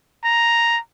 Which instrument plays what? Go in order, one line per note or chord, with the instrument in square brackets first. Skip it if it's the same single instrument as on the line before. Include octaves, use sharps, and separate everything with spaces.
[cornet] A#5